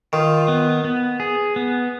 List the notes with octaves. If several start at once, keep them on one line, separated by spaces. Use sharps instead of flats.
D#3 F4
B3
B3
G#4
B3